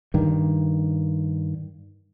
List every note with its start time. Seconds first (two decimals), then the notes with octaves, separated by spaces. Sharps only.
0.14 G2 D#3